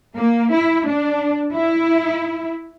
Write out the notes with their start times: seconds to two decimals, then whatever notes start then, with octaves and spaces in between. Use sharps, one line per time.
0.16 A#3
0.53 E4
0.87 D4
1.53 E4